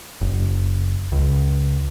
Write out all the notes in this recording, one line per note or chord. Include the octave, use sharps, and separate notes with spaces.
F#1
C#2